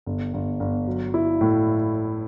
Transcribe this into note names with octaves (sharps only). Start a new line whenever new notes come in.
G1
G1
G1
F#3
E4
A2